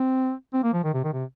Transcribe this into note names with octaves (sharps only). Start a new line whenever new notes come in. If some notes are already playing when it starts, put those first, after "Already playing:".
Already playing: C4
C4
A#3
F3
D#3
C3
D#3
C3